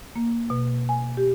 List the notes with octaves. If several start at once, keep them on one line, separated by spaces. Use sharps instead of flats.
A#3
B2
G#5
G4